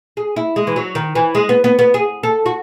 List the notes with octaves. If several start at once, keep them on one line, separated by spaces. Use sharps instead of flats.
G#4
E4
G#3
E3
F#3
D#3
E3
G#3
B3
B3
B3
G#4
A4
F#4